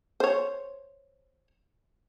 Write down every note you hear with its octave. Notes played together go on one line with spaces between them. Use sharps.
C5 C#5